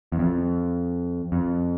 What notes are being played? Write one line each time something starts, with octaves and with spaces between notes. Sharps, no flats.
E2
F2
F2